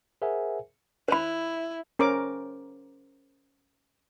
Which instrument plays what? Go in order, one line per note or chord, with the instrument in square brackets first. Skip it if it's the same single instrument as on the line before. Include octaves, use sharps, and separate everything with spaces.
[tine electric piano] G#4 A#4 C5 E5 F#5 G#5
[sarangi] E4 [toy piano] C5 B5
[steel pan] C#4 A#4 C5 D6